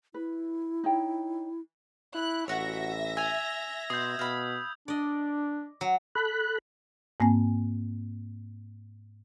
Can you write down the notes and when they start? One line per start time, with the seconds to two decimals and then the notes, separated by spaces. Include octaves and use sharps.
0.14 E4 B4
0.84 D#4 C#5 G5
2.15 E4 F#6
2.48 A1 F#4 C#5 E5 A#6
3.17 G#5 E6 G#6 F7
3.90 B2 C6 D#6 G6
4.19 B2 F5 B5
4.88 D4 D5 D#5
5.81 F#3
6.15 A4 B5 F#6
7.20 G#2 A#3 C4 G#5